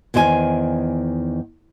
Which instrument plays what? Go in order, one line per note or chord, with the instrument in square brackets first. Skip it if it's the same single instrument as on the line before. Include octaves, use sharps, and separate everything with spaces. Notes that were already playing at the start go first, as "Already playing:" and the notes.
[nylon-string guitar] E2 D#3 C5 D5 G#5